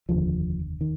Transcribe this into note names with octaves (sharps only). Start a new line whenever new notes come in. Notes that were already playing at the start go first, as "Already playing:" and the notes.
F1 D#2 D3 F3
D#3